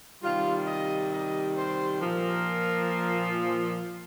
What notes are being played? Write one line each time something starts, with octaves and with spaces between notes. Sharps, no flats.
C3 D#3 G3 F4
D#5
D#5
C5
A#2 F3 A#4